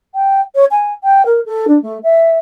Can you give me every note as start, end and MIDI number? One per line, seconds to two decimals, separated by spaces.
0.15 0.41 79
0.55 0.65 73
0.71 0.93 80
1.04 1.25 79
1.26 1.40 70
1.46 1.66 69
1.68 1.81 62
1.82 1.99 57
2.03 2.38 76